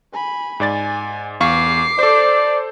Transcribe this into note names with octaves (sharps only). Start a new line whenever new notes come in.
G#5 B5
G#2 D5 G#5 A6
E2 F5 C#6 D6 C7
A4 C5 D5